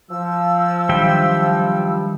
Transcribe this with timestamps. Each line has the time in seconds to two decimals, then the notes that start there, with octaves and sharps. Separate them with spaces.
0.10 F3 E6
0.89 D#3 F#3 G3 D4 E5 G5